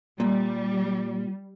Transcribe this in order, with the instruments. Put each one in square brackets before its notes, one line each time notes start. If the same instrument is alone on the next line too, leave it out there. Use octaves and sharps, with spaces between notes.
[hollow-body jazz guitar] A#2 [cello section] G3